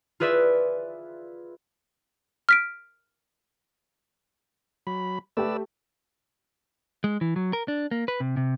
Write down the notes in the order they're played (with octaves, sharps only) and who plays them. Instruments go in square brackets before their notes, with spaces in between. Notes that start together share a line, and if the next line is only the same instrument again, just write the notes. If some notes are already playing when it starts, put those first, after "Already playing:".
[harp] F4 G#4 B4 D5 E5
[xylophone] F6 B6 D7
[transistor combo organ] F#3 B5
[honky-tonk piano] A3 G4 [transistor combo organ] B4 D5 E6
[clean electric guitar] G#3
E3
F#3
A#4
D4
A#3
B4
C3
C3